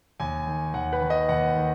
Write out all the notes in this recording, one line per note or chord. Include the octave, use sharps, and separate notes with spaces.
D#2 G#5
D#3
D#2 F#5
B4
D#3
D#5
D#2 F#5
D#3